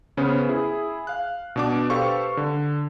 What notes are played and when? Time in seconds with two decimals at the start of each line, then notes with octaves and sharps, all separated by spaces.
0.17 C#3 B3 C#4 C5
0.49 E4 G#4
1.07 F5 F#6
1.56 B2 D4 D6
1.90 G4 A4 B4 C5 F5 C#6
2.37 D3